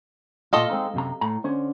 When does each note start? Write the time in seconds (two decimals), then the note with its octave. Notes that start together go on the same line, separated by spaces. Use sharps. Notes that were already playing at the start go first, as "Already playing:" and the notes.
0.53 A#2 F4 A4 D#5 F5
0.70 G#3 C4 D#4
0.94 F#2 C3 A#5
1.21 A2 A#5
1.44 D3 C#4 C5